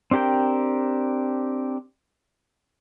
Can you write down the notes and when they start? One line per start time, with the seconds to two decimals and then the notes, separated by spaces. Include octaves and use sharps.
0.11 C4 D4 G4 A#4 G5